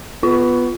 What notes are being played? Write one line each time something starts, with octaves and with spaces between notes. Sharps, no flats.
B3 F4